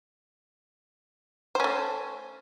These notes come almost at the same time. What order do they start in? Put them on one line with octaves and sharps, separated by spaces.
C5 C#4 A3